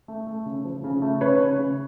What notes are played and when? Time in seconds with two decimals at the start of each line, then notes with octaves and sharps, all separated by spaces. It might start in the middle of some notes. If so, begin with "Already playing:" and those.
0.08 A3
0.27 A3
0.46 C#3
0.65 F3
0.84 C#3
1.02 A3
1.21 C#3 B4 C#5
1.40 C#3
1.59 C#3